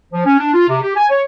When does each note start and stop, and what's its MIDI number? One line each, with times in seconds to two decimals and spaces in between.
0.13 0.25 53
0.26 0.36 61
0.39 0.51 62
0.54 0.68 65
0.69 0.77 48
0.82 0.93 67
0.96 1.06 80
1.10 1.22 73